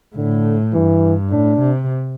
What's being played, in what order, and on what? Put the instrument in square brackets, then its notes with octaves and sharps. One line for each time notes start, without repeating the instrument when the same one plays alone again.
[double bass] A2 [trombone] D3
[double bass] G2 [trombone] E3
[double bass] A2 [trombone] D4
[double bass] C3